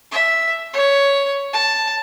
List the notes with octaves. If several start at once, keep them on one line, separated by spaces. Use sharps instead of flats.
E5
C#5
A5